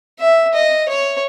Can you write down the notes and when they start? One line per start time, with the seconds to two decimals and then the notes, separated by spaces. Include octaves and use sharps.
0.20 E5
0.54 D#5
0.89 C#5